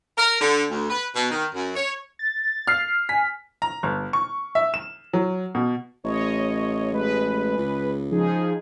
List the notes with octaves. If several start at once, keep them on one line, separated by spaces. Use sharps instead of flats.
A#4
D3
D2
B4
B2
D#3
F#2
C#5
A6
F6 C7
G#5 B6
A#5
G1
C#6
E5
E7
F#3
B2
A1 C#5 D#5
G#3 B4
C#2
F3 D#4 G#4